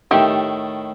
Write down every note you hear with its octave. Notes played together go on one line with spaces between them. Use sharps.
A2 D#3 A3 G4